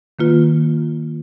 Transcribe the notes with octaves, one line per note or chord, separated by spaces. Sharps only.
D#3 A#3 F4 B4